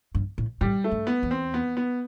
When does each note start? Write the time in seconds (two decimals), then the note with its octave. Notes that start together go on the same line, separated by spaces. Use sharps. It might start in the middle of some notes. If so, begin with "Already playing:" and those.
0.15 G2
0.38 A2
0.61 A2 G3
0.84 A3
0.91 G2
1.07 B3
1.23 E2
1.31 C4
1.54 B3
1.77 B3